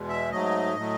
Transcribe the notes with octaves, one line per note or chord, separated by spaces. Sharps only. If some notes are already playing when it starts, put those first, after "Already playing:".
Already playing: E2 B2 G#3
E5
G#2 F#3 A3 D#5
A2 F#3 A3